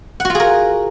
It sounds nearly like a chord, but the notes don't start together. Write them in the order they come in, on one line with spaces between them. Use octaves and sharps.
F#5 F#4 F4 G#4 A#4